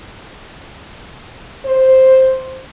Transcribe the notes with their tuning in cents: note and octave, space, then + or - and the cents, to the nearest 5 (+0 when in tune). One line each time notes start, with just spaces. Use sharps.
C5 +0